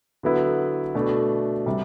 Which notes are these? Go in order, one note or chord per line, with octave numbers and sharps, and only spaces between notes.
D3 F#3 B3 E4 B4
B2 A3 D4
C3 G3